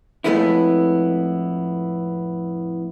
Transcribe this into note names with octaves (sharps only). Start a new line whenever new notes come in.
F2 A2 G#3 A3 B3 E4